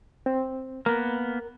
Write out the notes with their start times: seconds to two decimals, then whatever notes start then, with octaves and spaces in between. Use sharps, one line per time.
0.26 C4
0.86 A#3 B3 A#4